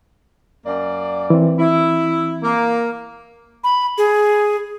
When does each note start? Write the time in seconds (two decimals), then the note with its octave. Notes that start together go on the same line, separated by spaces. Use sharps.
0.66 F#2 A#3 D5
1.30 E3 C4
1.58 E4
2.43 A#3
3.64 B5
3.98 G#4